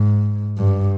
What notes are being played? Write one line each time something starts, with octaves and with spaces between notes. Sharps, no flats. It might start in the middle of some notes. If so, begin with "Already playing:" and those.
Already playing: G#2
G2